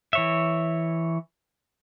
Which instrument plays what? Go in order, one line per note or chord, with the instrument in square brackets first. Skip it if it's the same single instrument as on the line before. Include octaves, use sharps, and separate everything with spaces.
[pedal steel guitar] E3 C#5 E5